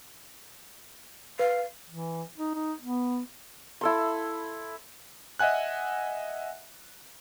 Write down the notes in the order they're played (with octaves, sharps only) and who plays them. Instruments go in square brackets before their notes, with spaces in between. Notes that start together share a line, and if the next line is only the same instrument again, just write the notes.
[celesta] B4 [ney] F5
[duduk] E3
D#4
D#4
B3
[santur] E4 A4 C6
[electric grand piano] D#5 E5 F#5 G#5 F#6